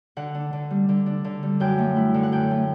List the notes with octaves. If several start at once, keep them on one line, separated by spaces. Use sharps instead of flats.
D3 F#5
D4
D3
G3
D3
D4
D3
G3
F#2 G5
A3
E4
D3
F#5
F#2 G5
A3